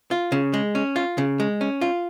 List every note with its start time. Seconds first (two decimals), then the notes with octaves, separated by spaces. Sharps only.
0.11 F4
0.32 C#3
0.54 G#3
0.75 C#4
0.96 F4
1.18 C#3
1.40 G#3
1.61 C#4
1.81 F4